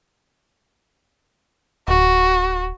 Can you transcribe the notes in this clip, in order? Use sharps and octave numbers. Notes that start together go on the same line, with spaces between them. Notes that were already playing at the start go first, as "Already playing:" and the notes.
D1 F#4